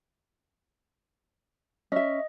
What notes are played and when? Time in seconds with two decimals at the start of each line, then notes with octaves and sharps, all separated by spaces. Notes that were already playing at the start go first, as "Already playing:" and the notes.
1.92 C#4 D#5 E5